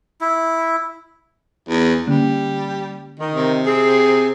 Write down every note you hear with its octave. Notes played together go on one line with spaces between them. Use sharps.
E4
E2
D3 G3 A#3 C#4
D#3
C3
C4 G#4